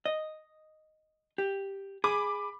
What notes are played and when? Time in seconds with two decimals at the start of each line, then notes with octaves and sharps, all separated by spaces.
0.06 D#5
1.38 G4
2.04 G#4 B5 D6